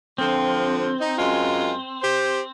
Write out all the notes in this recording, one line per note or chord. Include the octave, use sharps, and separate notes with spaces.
D3 F3 C4
D#4
F#2 G#3 F4
G4 C5